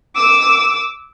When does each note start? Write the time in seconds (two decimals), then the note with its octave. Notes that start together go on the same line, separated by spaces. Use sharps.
0.16 D6 E6